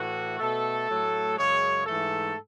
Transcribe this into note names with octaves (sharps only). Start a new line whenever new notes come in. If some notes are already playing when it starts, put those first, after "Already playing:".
Already playing: A2 E3 A3 F#4
B2 A3 A4
A2 F#3 A3
F#2 C#3 G#3 C#5
G#2 E3 A3 A4